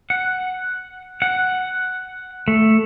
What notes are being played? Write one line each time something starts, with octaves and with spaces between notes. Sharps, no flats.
F#5
F#5
A3